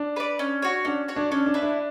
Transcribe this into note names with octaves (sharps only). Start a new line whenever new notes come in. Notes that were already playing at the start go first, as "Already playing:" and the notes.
Already playing: D4
B4 D5
C#4
F#4 C#5
C#4 D4
F#4 C#5
D4
C#4 D4
D4
E4 B4
D4